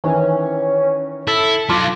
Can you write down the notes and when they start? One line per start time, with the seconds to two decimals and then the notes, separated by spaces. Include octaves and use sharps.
0.04 D#3 E3 C#4
1.27 E4 A4
1.69 F#3 D#4 F4 A5 C6 D6